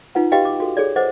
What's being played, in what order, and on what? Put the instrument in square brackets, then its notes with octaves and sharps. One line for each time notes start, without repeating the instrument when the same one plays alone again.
[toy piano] D#4 F4 B4 F#5
F#4 G4 B4 D#5 F5 G5
D6
F#4 A4
G#4 A4 C#5 D5
A4 B4 C5 D#5 F#5 D6